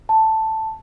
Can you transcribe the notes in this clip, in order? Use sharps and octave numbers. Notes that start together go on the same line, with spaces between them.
A5